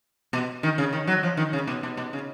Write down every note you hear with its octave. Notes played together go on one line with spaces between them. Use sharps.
B2
D#3
C#3
D#3
F#3
F3
D#3
C#3
B2
B2
B2
C#3